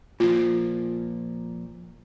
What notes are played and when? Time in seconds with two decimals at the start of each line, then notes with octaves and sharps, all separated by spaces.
0.20 A#2 F3 F4